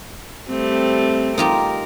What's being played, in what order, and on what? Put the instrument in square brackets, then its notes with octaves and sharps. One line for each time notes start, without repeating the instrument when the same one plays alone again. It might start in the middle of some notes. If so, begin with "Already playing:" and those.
[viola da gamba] G3 A3 C4
[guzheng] D#4 F4 G4 [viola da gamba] A#4